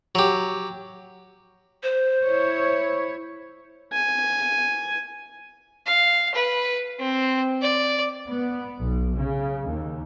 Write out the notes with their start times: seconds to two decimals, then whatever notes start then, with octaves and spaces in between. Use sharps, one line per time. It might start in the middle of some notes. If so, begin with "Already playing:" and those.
0.15 F#3 G4
1.83 C5
2.25 E4 C#5
3.93 G#5
5.87 F5
6.35 B4
6.99 C4
7.62 D5
8.28 B3
8.79 B1
9.18 C#3
9.68 D#2